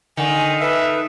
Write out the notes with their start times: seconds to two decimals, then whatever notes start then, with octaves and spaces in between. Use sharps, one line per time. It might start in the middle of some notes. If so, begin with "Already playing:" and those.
0.17 D3 D#3 G#5
0.61 A4 B4 E5